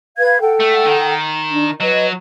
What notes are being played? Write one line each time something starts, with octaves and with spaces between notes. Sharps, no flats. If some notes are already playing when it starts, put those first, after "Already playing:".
B4 F5 G#6
A4 F#5 G5
A3
D#3
D4
F#3 B4 D#5